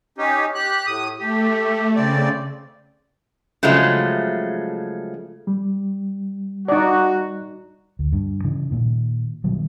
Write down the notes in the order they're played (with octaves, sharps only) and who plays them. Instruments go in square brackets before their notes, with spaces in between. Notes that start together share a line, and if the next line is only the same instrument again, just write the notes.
[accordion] C#4 D#4 G4
G4 F#6
A2 D#6
[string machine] A3 [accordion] G4
[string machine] C#3 [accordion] C4 D5
[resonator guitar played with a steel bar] C#3 F3 F#3 G#3 A3
[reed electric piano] G3
[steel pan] D#4 D5 [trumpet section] F#4
[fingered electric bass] D2
G2
C#3 E3
A#2 D#3
B2 D#3 F#3 G3